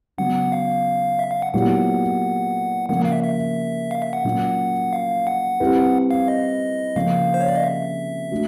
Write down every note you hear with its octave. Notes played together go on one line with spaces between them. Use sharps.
C#3 F#3 B3 F#5
F5
E5
F5
F#5
A#2 F#3 B3 E4 G4 F#5
C#3 F3 A#3 F#5
F5
E5
E5
F5
E5
F#5
A#2 F#3 A#3 C#4 F4
F5
F#5
G3 C4 E4 G4 B4
F5
D#5
C#3 F3 A#3 C#4 F5
C5
C#5
D5
D#5
E5
A3 D4 F#4